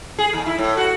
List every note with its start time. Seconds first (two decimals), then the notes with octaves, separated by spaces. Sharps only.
0.19 G#4
0.33 D#2
0.46 E4
0.59 A2
0.77 F#4